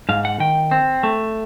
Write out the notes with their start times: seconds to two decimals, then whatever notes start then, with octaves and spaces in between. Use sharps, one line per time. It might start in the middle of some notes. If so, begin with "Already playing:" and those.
0.09 G#2 F5
0.25 F#5
0.40 D#3 G5
0.71 C4
1.03 A3